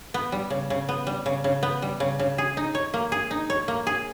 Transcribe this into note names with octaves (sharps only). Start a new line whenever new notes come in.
B3
G3
C#3
C#3
B3
G3
C#3
C#3
B3
G3
C#3
C#3
G#4
D#4
C#5
A#3
G#4
D#4
C#5
A#3
G#4